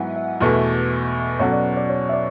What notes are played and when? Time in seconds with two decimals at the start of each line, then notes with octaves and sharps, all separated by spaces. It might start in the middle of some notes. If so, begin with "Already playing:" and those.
Already playing: G#2 F#3 B3 E4 E5 F#5 G#5
0.16 E5
0.41 E2 B2 A3
1.39 B2 F#3 C#4 F#4 A4 C#5
1.52 D5
1.77 D5
1.90 C#5
2.09 E5
2.13 D5